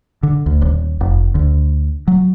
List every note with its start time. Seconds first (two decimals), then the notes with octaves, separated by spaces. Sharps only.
0.23 D3
0.46 D2
0.62 D#1
1.01 F1
1.35 D2
2.08 F#3